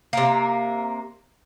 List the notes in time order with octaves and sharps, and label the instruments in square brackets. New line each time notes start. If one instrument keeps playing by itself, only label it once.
[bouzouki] C3 A#3